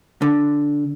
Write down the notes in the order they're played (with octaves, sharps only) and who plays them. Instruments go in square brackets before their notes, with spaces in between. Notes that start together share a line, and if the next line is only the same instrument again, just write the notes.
[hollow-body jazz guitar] D3